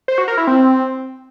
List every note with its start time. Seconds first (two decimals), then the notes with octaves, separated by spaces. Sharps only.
0.08 C5
0.18 F#4
0.28 A#4
0.38 E4
0.47 C4